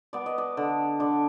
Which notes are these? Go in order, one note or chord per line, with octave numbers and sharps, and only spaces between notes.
B3 D5
D#5
D5
D3
D3 D5